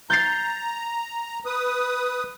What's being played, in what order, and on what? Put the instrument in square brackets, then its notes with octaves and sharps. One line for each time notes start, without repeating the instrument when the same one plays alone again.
[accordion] A#5 [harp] G6 A6 C7
[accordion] B4 D#6